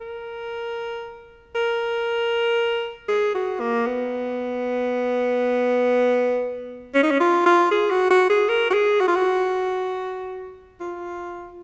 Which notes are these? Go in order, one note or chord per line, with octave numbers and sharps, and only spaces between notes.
A#4
A#4
G#4
F#4
A#3
B3
C#4
D#4
C#4
F4
F4
G#4
F#4
F#4
G#4
A#4
F#4
G#4
F#4
F4
F#4
F4